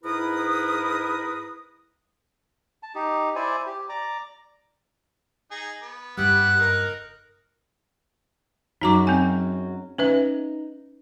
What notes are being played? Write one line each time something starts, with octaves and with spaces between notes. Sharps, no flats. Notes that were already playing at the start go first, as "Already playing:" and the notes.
G#2 E4 A#4 B4 D#6
A5
D#4 G4
E4 C5 D5 G#5
G4
D5 A#5 D6
D#4 G#4
B3
F#1 G2 G3 B3 E4 G4 F#5 F#6
D#4 A#4
F#2 F#3 G#3 D#4 A#5 D6
C4 G#5
C#4 D#4 B4 E5